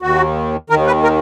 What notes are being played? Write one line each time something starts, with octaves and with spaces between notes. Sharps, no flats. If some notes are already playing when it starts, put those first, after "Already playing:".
D#2 D#3 F#4
D#2 D#3 A#4
B4
A#4